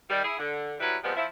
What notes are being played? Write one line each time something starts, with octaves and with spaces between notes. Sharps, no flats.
D#3 G3
E4 G#4
D3
F#3 G3 E4 B4
F3 G3 G#3 B3 C4
F3 E4